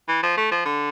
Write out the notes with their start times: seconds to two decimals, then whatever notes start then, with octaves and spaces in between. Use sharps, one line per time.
0.08 E3
0.23 F3
0.37 A3
0.51 F3
0.65 D3